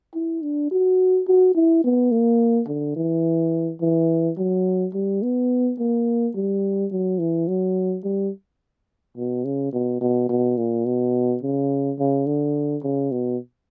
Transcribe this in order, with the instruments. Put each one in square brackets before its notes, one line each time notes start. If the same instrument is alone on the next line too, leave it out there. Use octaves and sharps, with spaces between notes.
[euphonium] E4
D4
F#4
F#4
E4
B3
A#3
D3
E3
E3
F#3
G3
B3
A#3
G3
F#3
E3
F#3
G3
B2
C#3
B2
B2
B2
A#2
B2
C#3
C#3
D3
C#3
B2